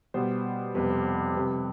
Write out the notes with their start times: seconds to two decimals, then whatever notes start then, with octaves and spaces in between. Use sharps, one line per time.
0.14 B2 G3 B3 C5
0.74 F2 C3 G3 B3 B4
0.90 C5
1.35 C3 G3 C4 B4